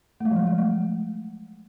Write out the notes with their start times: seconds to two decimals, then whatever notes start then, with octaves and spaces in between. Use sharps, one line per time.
0.20 A3
0.25 G#3
0.31 F3
0.36 F#3
0.47 G#3
0.58 A3